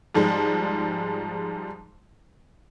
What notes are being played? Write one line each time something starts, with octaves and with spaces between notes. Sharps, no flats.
G#2 F3 G3 G#3